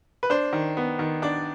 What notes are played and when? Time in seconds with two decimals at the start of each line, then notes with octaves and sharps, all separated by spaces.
0.23 B4
0.30 D4 C5
0.53 D#3
0.77 B3
0.99 D#3
1.22 D4 D5